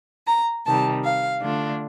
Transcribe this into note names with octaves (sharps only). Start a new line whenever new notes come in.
A#5
C3 D#3 G3 A5
F5
D3 A3 D4 F4